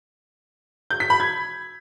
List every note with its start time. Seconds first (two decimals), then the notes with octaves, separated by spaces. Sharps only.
0.90 G6
1.00 B6
1.10 B5
1.20 G#6